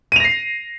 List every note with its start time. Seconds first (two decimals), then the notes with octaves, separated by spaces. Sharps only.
0.12 D#7
0.16 F7
0.20 A#6
0.24 C7